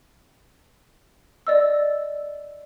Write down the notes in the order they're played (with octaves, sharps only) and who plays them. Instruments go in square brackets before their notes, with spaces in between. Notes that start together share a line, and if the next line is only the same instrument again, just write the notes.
[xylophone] D5 D#5 E6